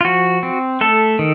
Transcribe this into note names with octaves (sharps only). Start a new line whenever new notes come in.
F4
F3 F#4
C4
A3 A4
D#3